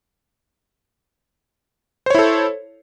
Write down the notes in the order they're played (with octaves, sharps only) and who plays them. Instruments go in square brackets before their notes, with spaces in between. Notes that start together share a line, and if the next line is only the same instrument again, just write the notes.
[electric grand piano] C5
C#5
E4
A4